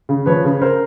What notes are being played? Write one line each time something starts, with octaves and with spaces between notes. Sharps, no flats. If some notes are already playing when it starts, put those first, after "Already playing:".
C#3
F3 B4 C#5
C#3
A#4 C5